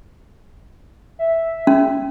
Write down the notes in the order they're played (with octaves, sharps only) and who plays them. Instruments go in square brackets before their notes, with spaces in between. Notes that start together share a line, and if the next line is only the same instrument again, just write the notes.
[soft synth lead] E5
[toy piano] C#4